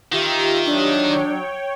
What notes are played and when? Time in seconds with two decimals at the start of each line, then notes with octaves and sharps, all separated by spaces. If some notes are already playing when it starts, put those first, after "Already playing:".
0.12 D#3 F4 G4 E5
0.65 F#3 D4
1.10 C#5 G5